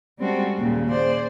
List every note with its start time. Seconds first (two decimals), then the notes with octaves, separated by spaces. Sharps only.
0.18 G3 G#3 C4 C#4 F#4 A4
0.57 D#2 A#2 C#3
0.90 G#4 C5 D5